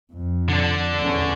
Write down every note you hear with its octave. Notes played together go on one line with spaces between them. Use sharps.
F2
D3 D4
E2 C#4